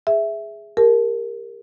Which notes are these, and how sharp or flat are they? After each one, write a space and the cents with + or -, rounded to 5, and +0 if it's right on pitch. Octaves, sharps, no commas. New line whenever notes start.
G#4 +0 E5 +0
G4 +35 A#4 +0 A5 -25